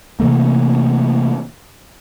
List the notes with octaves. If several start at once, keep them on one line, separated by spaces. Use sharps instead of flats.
C3 E3 A3 A#3